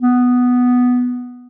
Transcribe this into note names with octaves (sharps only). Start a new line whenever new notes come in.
B3